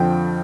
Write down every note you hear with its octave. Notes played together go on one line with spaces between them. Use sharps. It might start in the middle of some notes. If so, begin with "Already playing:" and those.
Already playing: F2 D3 F3 G5